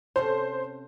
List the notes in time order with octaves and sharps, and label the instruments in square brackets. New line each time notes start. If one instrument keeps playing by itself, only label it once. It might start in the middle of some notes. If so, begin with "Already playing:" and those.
[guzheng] C3 C#4 A4 [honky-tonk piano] C5